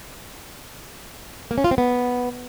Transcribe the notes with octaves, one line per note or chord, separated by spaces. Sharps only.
A#3
C#4
F4
C4
B3